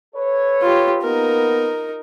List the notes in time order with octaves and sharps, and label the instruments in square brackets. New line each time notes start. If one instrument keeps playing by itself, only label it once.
[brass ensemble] A4 B4 C#5
[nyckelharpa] F4 G4
[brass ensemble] A#3 B3 [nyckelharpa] D#4 A#4